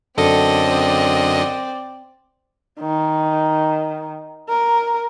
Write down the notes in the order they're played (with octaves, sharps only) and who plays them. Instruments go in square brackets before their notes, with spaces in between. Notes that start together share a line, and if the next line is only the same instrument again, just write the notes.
[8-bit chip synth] F#2 D3 D#5 [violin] C4 D5 [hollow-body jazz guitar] A4
[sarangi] D#3
A#4